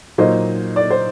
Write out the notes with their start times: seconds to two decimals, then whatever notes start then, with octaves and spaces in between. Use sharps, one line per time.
0.18 A#2 F#3 A#3 D#4 C5 D#5
0.76 D5
0.90 C5